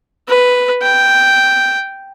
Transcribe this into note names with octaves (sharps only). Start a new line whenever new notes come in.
B4
G5